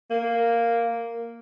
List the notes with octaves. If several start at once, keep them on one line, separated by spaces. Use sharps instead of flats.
A#3